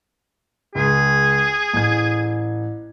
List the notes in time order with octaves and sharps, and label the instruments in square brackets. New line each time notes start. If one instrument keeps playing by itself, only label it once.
[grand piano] C#2 [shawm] G#4
[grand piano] A1 G#6